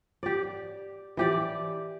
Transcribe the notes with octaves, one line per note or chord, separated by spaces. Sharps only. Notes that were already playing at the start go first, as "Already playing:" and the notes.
G4 D5
E3 G4 D5